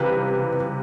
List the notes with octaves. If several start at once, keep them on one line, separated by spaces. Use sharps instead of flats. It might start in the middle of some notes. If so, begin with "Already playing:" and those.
Already playing: C#2 C3 E3 G3 B4